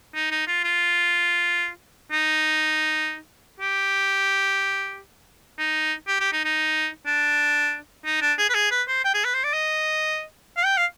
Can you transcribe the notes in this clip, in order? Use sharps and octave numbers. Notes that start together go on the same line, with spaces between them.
D#4
D#4
F4
F4
D#4
G4
D#4
G4
G4
D#4
D#4
D4
D#4
D4
G#4
B4
G#4
B4
C5
G5
G#4
B4
C5
D5
D#5
F5
G5
F5